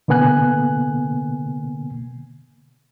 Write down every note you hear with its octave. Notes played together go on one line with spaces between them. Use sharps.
B2 D3 A#3 B3 G#5 F#6